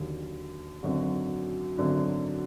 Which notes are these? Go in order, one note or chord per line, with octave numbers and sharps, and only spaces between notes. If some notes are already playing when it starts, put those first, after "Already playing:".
Already playing: D#2 D3 F#3
G#1 F#2 D3 F#3 F#4
G#1 F#2 D3 F#3